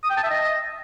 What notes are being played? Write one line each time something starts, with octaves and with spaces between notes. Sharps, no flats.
D#6
G5
A5
E5
D#5